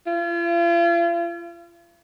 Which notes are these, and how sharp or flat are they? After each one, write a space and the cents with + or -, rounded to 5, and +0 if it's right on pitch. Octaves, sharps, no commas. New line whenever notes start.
F4 -40